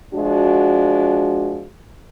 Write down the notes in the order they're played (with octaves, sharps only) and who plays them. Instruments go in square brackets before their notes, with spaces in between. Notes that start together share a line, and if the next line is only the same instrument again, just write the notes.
[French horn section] F3 G#3 D4 F#4